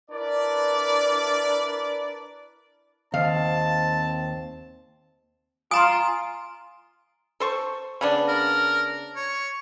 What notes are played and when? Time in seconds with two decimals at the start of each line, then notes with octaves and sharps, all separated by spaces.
0.11 D4 E4 A#4 B4 D5
3.14 D#2 C4 F5 A5
5.71 F4 G#5 A#5 C6 D#6
7.40 A4 C5 C#6
8.01 C#3 B3 D4
8.28 A#4
9.16 C#5